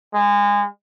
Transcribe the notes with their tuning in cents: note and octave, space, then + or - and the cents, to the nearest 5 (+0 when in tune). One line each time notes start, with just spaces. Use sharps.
G#3 -25